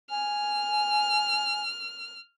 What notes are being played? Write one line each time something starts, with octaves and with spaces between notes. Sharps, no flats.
G#5 F6